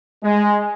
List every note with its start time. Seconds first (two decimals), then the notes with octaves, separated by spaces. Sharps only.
0.23 G#3